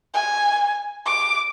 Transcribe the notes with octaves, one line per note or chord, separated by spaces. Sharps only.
G#5
D6